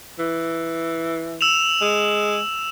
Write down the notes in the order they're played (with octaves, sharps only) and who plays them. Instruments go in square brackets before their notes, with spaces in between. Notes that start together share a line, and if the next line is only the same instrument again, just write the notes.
[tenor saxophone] E3
[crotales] E6 E7 F7
[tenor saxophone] G#3